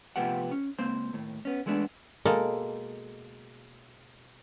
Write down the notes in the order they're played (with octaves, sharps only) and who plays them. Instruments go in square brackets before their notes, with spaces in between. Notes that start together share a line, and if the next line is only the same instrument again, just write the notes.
[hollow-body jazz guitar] C3 F3 A3 B3 G4 F#5
C#4
C#2 A#3 C4 C5 C6
D#2 A2
B3 C#4
E3 G#3 A3 B3 D4
[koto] B2 G#3 A#3 A4